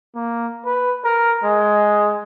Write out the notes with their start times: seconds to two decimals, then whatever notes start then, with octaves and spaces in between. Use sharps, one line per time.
0.15 A#3
0.65 B4
1.04 A#4
1.44 G#3